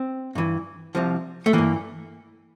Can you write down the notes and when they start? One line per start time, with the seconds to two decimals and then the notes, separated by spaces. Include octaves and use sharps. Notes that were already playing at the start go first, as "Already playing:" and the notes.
Already playing: C4
0.35 G2 E3
0.95 C2 C3 F3
1.46 A3
1.53 G2 E3 A#3